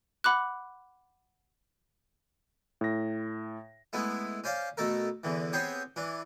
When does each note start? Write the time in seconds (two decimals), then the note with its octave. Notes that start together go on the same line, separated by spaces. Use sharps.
0.24 F#5 B5 D6 F#6
2.81 A2 A#6
3.93 G#3 A3 B3 E4
4.44 C#4 C5 D5 F5
4.77 B2 A3 A4 A#4
5.24 E2 D3 E3
5.53 B3 C4 G4 G#4 C5 C#5
5.96 E3 D4